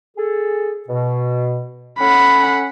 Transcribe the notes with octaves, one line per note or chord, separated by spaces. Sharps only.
G#4 A4
B2
C#4 A4 F#5 B5